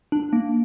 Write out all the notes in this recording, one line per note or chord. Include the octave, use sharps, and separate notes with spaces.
D4
A#3